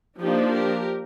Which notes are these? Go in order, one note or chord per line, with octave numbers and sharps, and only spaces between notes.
F3 A#3 D4 D#4 G4
G4 A#4